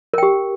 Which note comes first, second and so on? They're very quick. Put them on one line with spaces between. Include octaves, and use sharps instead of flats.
A#4 G5 G4